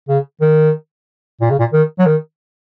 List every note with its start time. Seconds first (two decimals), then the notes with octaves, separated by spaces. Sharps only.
0.09 C#3
0.41 D#3
1.41 A#2
1.50 C#3
1.59 A#2
1.73 D#3
1.99 F#3
2.06 D#3